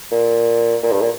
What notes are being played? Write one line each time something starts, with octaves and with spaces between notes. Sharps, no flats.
A#2
A#2
G2
A#2